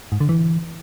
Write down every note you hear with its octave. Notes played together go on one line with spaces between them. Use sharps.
G#2
D3
E3